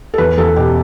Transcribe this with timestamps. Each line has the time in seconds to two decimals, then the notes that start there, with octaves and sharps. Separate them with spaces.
0.14 A4
0.18 E2 B4
0.38 E2 A4
0.56 B2 G4